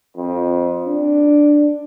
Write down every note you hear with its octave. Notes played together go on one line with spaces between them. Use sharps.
F2
D4